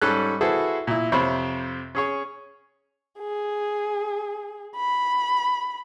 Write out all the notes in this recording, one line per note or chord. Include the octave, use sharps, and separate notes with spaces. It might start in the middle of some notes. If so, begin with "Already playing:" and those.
G#2 G3 C#4 A4 F#6
E4 F#4 G#4 A4 B4 C5
A#2 E4
F2 C3 C5 C#5 B5
C#4 G#4 C#5
G#4
B5